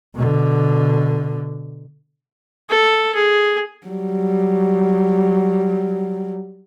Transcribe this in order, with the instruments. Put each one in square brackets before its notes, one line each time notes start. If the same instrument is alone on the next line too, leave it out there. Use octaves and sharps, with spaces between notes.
[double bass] B2 D3
[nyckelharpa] A4
G#4
[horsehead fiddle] F#3 G3